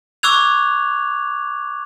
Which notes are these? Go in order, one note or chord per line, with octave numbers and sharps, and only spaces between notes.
C#6 D6 E6 F#6 G#6 F7